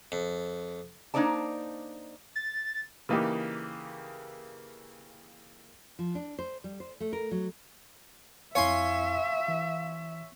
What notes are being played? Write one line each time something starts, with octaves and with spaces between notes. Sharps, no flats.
F2
A#3 D4 D#4 C5 D5 A5
A6
C#3 E3 A#3 D#4 G4
F3
D4
C5
G3
C5
A3
A#4
F#3
F2 E4 C#5 E5 F5 G#5 C6 C#7
E3